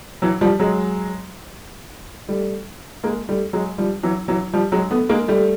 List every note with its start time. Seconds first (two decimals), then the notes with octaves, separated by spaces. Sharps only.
0.22 E3 F#3
0.41 F3 G3
0.59 F#3 G#3
2.29 G3 A3
3.03 G#3 A#3
3.29 G3 A3
3.53 F#3 G#3
3.78 F3 G3
4.03 E3 F#3
4.28 E3 F#3
4.53 F3 G3
4.72 F#3 G#3
4.91 A3 B3
5.09 G#3 A#3
5.28 G3 A3